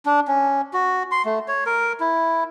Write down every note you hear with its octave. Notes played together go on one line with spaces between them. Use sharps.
D4
C#4
F#4
C6
A3
C#5
A#4
E4